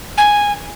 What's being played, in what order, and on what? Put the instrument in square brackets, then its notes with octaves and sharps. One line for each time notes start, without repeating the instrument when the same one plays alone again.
[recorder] G#5